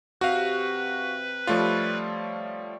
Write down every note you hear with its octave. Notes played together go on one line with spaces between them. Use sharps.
C3 F#4 B4 F5
F3 G3 A3 F4 C#5 E5